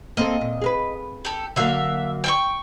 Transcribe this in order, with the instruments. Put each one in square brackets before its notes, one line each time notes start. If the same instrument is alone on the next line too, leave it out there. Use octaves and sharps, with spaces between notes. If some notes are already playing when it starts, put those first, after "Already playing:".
[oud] A#3 C4 A4 [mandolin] D#5
[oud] A#2
G#4 A#4 B4
[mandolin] G4 A4
[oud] D3 F#3 A#3 [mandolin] E5 F5
[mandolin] G5 G#5 C#6